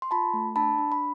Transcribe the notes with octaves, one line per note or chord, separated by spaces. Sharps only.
C6
F4 A5 B5
A3
D4 A5 B5
D4
B5